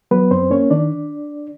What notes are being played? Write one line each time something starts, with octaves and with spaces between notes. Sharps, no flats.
F#3 B3 B4
F#2 C4 C5
A#3 C#4 C#5
D#3 D4 D5